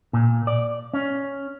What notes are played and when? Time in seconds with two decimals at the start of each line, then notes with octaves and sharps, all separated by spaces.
0.13 A#2
0.47 D5
0.94 C#4